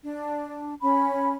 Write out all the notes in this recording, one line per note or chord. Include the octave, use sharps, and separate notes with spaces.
D4
C#4 B5